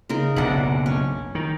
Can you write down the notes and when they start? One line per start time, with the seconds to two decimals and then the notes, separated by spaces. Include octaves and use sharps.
0.09 C#3 D#4 A#4
0.36 F#1 B1 A#2 D4 F#5
0.86 C#4
1.35 D#3